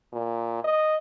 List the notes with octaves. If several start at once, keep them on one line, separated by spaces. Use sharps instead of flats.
A#2
D#5